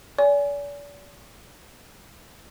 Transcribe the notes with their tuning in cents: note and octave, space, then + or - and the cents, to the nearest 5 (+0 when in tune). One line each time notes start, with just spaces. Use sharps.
D5 -40 G#5 +0